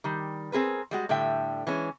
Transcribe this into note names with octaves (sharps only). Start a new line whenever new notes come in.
D#3 G3
C4 G#4 A#4 B4
G3 G#3 F#4
A2 D3 G3 E5 G5
E3 G#3 C#4